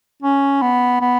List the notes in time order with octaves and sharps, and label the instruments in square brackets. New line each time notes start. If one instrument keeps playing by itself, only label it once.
[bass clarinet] C#4
B3
B3